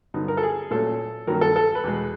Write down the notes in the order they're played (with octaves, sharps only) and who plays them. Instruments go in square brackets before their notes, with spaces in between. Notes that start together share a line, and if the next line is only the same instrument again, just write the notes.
[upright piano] G2 D3 F#3 B3 D#4
A#4
A4
G#4
A#2 F#3 A3 C#4 A4
G2 D#3 F#3 A#3 C#4 A#4
A4
A4
B4
E2 B2 G#3